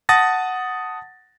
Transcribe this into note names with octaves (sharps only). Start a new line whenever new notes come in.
F#5 A5 D#6 A6 A#6